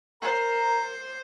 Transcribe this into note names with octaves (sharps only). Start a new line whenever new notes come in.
A#4 C5 A#5